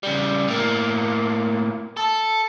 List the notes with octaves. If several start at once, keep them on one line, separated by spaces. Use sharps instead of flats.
C#3 G3
A2 A#3
A4